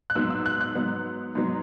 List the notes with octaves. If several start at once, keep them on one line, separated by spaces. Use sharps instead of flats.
F#6
G#2 F#3 B3 E6
E6
F#6
F#6
G#2 F#3 B3
G#2 F#3 B3